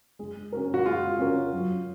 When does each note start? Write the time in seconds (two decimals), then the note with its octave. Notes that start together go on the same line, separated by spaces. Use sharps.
0.19 G#3
0.52 C#4 F#4 A#4
0.74 F#4
0.86 G#3 F4
1.19 C#4 F#4 A#4
1.53 F#3